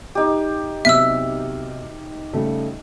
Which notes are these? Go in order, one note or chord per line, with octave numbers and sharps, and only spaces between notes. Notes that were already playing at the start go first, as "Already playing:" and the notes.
D#4 G4
B1 C3 E5 E6 F6
C#3 G3 A3